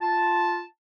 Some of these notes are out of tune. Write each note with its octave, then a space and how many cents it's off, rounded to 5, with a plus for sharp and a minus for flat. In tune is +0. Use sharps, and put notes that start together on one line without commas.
F4 +0 A5 -5